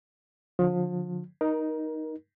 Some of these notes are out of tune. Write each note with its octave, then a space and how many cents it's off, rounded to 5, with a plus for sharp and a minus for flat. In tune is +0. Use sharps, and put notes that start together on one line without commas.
D3 +0 F3 +35
D#4 +0 A#4 +20